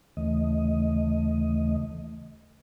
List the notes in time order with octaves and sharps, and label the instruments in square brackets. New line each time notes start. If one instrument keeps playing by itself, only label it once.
[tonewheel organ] D#2 C#3 E3 A3 D#5